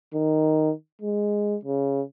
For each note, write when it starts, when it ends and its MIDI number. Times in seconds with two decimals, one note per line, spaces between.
0.14 0.71 51
1.01 1.56 56
1.65 2.01 49